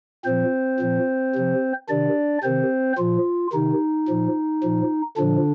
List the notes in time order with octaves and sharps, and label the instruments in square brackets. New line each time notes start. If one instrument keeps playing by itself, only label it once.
[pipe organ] A#2 F3 C4 C5
A#2 F3
C3 F3
C3 D#3 D4 D5
C3 D#3 C4 C5
A#2 F3 F4
C3 D#3 D#4
A#2 F3
A#2 F3
A#2 D3 F3 D4